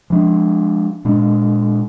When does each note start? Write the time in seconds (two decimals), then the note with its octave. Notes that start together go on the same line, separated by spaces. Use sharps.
0.10 F3 G#3 D4
1.05 A#2 G#3 D4